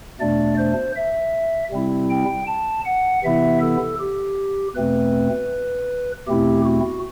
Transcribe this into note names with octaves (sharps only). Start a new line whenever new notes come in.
E2 B2 A3 D4 D5
C5
E5
C3 G3 C4 E4
G5
A5
F#5
C3 E3 B3 E4 E5
A4
G4
E2 B2 A3 C4 B4
E2 B2 A3 C4 E4 G4
F#4